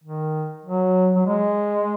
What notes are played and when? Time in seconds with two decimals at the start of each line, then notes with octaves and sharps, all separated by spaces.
0.04 D#3
0.65 F#3
1.15 F#3
1.26 G#3